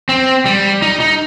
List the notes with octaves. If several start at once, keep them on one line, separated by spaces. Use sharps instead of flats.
C4
G3
D#4
D#4